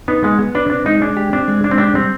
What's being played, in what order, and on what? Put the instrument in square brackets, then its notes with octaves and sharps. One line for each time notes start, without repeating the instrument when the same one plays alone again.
[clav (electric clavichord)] B3 [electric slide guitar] D#4
[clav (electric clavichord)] G#3 [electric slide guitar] B3
[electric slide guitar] B3
[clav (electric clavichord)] D4 [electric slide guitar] B4
[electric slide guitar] C4 [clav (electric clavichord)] D4
[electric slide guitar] G#3 [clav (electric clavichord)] D#4
[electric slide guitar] G#3 [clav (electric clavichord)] D4
[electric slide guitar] G4
[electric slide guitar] C4 [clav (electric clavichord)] D4
[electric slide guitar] G#3
[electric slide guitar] G#3 [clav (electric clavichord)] D4
[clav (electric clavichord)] C4
[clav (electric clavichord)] D4 [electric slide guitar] G4
[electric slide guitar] G3 [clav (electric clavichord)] C4